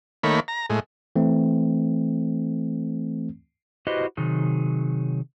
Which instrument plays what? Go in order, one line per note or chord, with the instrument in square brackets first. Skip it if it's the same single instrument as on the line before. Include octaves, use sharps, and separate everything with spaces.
[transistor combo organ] D#3 A3 A#3 C#5 B5
A#5
A2 G#3
[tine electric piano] E3 A3 C4
[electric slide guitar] E4 F#4 G4 B4 C5 D#5
C3 D#3 F#3 D#4 G#4